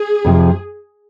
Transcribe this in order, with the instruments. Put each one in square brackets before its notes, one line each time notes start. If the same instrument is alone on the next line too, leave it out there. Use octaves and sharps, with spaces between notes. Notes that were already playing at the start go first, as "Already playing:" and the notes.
Already playing: [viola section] G#4
[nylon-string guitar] F2 C3 F3